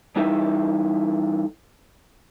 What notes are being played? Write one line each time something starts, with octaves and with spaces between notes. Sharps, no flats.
E3 G3 D#4 E4 A4 E5